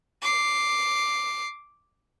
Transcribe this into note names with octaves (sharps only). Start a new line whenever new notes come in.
D6 C7